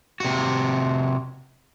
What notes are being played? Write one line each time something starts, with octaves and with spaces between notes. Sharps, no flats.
C3 F#4